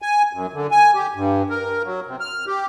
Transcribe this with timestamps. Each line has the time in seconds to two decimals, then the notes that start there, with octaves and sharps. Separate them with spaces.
0.02 G#5
0.33 F#2
0.53 D3
0.71 G#5
0.95 G4
1.15 G2
1.50 A#4
1.84 F#3
2.06 C3
2.20 F6
2.47 G4